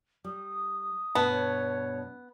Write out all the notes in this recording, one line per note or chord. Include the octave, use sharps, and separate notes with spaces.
G3 D#6
G2 B2 B3 A5
C#5